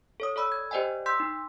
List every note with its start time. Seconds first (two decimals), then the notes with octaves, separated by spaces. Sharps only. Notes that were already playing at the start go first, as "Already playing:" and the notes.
0.20 A4 C#5 D#6
0.36 A4 D5 B5 E6
0.52 G#6
0.71 G4 C5 D5 D#5 G5 G#5
1.06 C6 E6 G6 B6
1.20 D#4